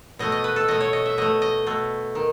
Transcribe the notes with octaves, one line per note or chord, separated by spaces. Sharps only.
B2 A3 D#5
D#5
B4
A4
B2 A3 D#5
C#5
D#5
E5
B2 A3 D#5
D#5
B2 A3
D#3